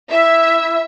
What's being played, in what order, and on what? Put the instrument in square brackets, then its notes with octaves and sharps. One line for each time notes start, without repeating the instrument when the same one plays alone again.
[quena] E4 [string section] E5